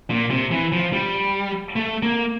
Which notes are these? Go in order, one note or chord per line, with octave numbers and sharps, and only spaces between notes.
A#2
C3
E3
F3
G3
A3
A#3